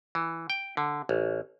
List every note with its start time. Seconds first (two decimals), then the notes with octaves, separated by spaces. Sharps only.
0.15 E3
0.50 G5
0.77 D3
1.09 A1